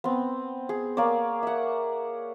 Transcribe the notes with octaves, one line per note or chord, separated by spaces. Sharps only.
B3 C4
G#4
A#3 G#4 C#5 D5
E5 F#5